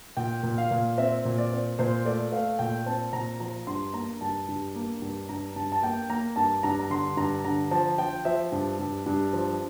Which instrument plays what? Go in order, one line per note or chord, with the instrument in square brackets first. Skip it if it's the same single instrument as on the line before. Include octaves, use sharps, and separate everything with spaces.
[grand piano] A#2 G5
A#2
F5
A#2
C4 E5
A#2
D5
C4
A#2 C5
A3 D5
A3 F5
A#2 G5
C4 A5
A#2 A#5
F3 A#5
G2 C6
A#3 A#5
G2 A5
G2
A#3
G2
G2 A#5
G2 A5
A5
A#3 G5
A#3 A#5
G2 A5
G2 A#5
A#5
D3 C6
G2 A#5
D3 A#5
F3 A5
F3 G5
F3 E5
G2
G2
G2
F3